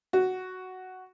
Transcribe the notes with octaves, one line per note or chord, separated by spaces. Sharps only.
F#4